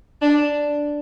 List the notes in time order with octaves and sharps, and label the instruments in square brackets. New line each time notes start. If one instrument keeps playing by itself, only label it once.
[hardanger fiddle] D4